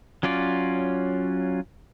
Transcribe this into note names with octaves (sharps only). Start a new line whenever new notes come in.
F#3 C#4 F4 D5